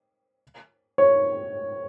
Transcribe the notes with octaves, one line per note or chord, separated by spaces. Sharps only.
C#5